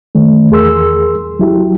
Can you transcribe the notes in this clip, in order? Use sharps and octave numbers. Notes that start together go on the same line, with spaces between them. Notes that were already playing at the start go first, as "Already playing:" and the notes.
D#3 A3
E2 G#4 A#4 C6 E6
F#3 E4 G4